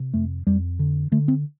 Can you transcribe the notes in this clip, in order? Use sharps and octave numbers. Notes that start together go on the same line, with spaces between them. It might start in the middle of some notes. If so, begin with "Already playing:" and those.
Already playing: C3
F2 A3
F2 G3
D3
D3 A3
C4